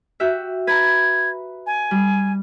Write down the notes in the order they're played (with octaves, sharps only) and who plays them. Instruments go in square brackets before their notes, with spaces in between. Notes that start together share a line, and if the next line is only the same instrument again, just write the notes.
[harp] F#4 G4 E5
[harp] B4 A#5 [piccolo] G#6
[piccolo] G#5
[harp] G3